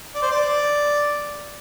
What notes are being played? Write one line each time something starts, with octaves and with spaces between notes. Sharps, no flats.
D5
C5
D5